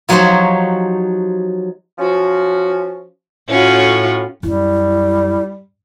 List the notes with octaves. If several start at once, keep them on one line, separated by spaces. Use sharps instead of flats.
F3 F#3 D#4 G4 C5 C#5
F3 C#4 F#4
A2 C#4 F4 F#4
F#2 G3 E4